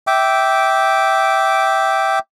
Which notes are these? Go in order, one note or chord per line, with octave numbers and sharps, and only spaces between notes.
E5 G5 D6